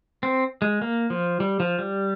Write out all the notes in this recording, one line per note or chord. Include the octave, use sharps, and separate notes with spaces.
C4
G#3
A#3
F3
G3
F3
G3